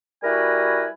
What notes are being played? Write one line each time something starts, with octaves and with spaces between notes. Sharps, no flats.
G3 E4 F#4 A#4 B4 G#5